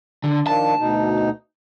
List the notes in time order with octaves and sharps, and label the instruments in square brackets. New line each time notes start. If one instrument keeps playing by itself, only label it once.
[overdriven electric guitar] D3
[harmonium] D#3 F3 D4 [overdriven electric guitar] A5
[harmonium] D2 B2 D#4